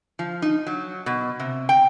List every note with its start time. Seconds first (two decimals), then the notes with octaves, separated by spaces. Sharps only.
0.19 F3
0.42 D#4
0.67 F#3
1.06 B2
1.40 C3
1.69 G5